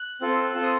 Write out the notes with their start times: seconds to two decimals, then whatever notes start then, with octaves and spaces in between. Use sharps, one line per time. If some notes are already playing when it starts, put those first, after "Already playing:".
Already playing: F#6
0.21 C4 F4 A4
0.54 C4 F4 A4 E6
0.63 D#6